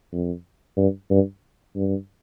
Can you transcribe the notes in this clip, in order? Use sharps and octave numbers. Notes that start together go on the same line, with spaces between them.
F2
G2
G2
G2